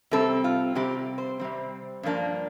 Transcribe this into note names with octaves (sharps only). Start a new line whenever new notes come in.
C3 G3 C4 A4
F4
C3 G3 C4 G4
C5
C3 G3 C4
G2 F3 A#3 D4